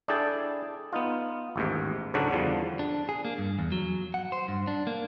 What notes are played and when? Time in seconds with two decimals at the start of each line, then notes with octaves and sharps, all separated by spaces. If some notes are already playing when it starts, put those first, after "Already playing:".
0.08 D4 E4 G#4 A4 G5 A5
0.93 B3 D#4 F4
1.56 A1 D#2 G#2
2.14 C#2 G#2 D3 F#3 D4 F#4
2.31 E2 D3 F3 G3
2.79 D4
3.09 G#4
3.25 A#3
3.38 G2
3.59 E2
3.72 F#3
4.14 F#5
4.32 C5
4.48 G2
4.67 D4
4.87 A#3